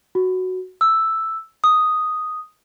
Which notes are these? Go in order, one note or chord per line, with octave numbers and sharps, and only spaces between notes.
F#4
E6
D#6